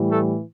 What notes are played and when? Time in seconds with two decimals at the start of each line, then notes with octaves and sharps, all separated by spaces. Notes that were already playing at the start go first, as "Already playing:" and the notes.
Already playing: A2 E3 G3
0.11 A3 A4